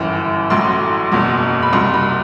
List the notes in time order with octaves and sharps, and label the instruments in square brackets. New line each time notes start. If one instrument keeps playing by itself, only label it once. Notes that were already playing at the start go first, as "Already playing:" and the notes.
Already playing: [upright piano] G1 F#2 E3
A1 A2 F#3 C6
F#1 E2 B2 F#3
B5
C2 C3 F#3 C6
B5